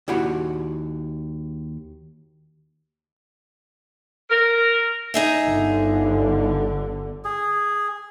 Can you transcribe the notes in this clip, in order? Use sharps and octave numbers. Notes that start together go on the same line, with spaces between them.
D#2 E4 F#4 F#5 B5
A#4
D#4 G#4 E5
G1 D3
G#4